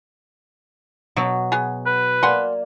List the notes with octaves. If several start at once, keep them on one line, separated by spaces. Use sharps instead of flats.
B2 F#3
B3 G#4
B4
A#3 D5 F#5 G#5 C6